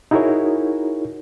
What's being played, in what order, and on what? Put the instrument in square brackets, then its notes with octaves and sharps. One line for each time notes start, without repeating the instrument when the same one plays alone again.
[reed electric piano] D#4 E4 F#4 G#4 A#4 C#5